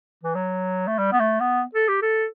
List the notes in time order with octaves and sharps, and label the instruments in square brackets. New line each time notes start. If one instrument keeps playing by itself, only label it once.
[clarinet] E3
F#3
A3
G3
B3
A3
B3
A4
G4
A4